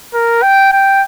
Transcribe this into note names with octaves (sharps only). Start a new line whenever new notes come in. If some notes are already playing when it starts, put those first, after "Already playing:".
A#4
G5
G5